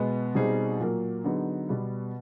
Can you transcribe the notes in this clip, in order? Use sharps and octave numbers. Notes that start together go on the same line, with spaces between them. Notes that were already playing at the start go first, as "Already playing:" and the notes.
Already playing: B2 G#3 B3
B2 G3 C4 D#4 G#4
A#2 F#3 A#3
D3 F#3 B3 D#4 G#4
B2 G3 B3